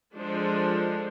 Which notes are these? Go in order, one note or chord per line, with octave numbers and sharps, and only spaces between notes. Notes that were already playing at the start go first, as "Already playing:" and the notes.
F3 G#3 D4 A4 C5